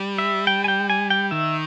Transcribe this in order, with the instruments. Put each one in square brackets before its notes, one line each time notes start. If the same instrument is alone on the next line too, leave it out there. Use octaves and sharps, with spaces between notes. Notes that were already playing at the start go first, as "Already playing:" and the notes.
Already playing: [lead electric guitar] G3
[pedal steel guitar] E5
G5
G#5
G5
G#5
G5
[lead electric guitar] D#3 [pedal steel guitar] E5